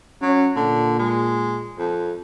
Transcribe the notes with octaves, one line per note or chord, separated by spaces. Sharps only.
F#3 C#4
A#2 D3
G#3
F2